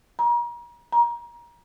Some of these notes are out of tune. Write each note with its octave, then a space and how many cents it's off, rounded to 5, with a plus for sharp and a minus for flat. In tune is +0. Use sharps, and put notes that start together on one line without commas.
A#5 +35
A#5 +25